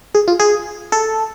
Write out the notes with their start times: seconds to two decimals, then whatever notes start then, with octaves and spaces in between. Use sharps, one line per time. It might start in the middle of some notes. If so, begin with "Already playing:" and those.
0.15 G#4
0.28 F4
0.40 G#4
0.92 A4